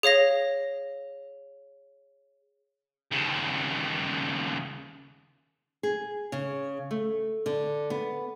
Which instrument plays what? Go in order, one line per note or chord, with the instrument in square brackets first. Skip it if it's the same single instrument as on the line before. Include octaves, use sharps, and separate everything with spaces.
[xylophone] G#4 C#5 F5 A#6
[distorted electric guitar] D#2 C#3
[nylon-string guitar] G#4
C#3
A3
D3
B3